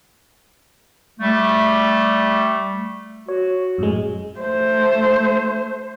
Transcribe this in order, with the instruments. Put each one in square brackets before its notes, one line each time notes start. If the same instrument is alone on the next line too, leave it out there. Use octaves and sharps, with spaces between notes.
[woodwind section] G3 A3
[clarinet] F#4 [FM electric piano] C#5
[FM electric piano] F#2 A2 G#3
[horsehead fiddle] A3 C5